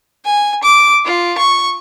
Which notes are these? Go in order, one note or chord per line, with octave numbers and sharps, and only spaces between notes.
G#5
D6
F4
C#6